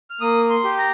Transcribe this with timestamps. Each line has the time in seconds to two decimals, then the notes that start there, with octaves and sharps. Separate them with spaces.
0.10 F6
0.21 A#3 D#6
0.50 C6
0.64 G4
0.78 A#5